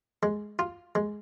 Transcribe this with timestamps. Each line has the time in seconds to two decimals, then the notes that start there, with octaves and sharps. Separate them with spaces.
0.23 G#3
0.59 F4
0.95 G#3